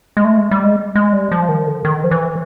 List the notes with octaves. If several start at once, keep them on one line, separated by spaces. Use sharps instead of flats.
G#3
A3
G#3
G3
G#3
G#3
G3
F3
D#3
D3
D#3
F3
E3